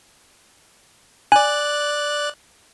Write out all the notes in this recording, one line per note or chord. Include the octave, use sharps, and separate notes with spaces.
D5 G#5 F#6